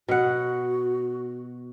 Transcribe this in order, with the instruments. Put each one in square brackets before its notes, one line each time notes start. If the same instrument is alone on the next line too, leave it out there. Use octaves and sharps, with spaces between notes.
[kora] B2 F#5 [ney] F#4